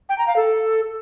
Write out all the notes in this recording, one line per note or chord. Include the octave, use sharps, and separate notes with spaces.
G5
A#5
F5
A4